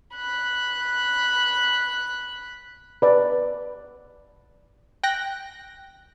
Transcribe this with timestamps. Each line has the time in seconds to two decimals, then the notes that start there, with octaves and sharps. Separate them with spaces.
0.15 B5 F#6
3.02 B4 D5
5.04 G5 F#6 A#6